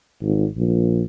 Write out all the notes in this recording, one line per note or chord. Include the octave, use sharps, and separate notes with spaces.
G#1
A#1